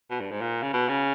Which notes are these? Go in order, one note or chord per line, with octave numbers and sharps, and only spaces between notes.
B2
G2
G#2
A#2
C#3
B2
C#3